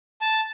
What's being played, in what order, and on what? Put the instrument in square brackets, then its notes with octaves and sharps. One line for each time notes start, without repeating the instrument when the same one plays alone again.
[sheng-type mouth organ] A5